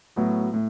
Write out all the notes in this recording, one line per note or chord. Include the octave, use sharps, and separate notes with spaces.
A2 F#3 B3 F#4
A2